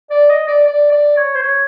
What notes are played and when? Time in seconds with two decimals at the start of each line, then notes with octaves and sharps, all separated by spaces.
0.10 D5
0.30 D#5
0.47 D5
0.67 D5
0.92 D5
1.17 C#5
1.35 C5
1.42 C#5